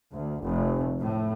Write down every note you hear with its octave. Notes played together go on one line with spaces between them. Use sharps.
D2
F1
A2